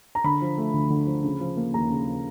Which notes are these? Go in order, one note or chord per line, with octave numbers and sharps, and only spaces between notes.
A#5
D3 B5
F3
A3
D2
D3
F3
C#3
F3
A#3
D#2 A#5
C#3
F3